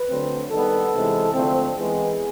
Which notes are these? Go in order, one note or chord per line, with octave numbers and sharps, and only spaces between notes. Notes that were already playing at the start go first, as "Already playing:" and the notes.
Already playing: B4
D3 F#3 A3 C4
D#3 G3 B3 A4
C3 E3 G#3
D3 F3 A3 C4
E3 G#3 B3 G#4